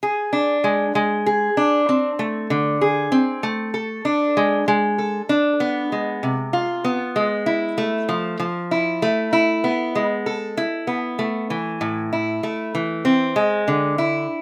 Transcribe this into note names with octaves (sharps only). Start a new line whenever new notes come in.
G#4
D4
G#3
G#3
G#4
D4
C4
A3
D3
G#4
C4
A3
A4
D4
G#3
G#3
A4
D4
B3
G#3
C3
F4
B3
G#3
E4
A3
F3
F3
E4
A3
E4
B3
G#3
A4
E4
B3
A3
E3
A2
E4
A3
E3
C4
G#3
D3
E4